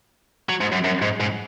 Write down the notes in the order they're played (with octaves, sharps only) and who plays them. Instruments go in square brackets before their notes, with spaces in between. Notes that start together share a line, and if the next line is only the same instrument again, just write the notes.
[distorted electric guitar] F#3
G#2
F#2
F#2
G#2
G#2